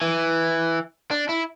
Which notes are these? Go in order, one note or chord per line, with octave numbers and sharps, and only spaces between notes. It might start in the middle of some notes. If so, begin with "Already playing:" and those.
E3
D4
E4